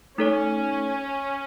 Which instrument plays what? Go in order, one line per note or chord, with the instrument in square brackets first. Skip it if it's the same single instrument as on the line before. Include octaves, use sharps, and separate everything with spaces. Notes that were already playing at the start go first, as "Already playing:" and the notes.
[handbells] A3 D#4 A4 C#5 [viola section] C#4